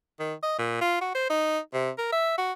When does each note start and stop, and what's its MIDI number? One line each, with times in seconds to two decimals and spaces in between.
0.20 0.34 51
0.43 0.59 75
0.59 0.78 46
0.81 1.01 65
1.01 1.15 66
1.15 1.27 72
1.30 1.59 63
1.74 1.90 48
1.98 2.09 70
2.12 2.34 76
2.38 2.52 66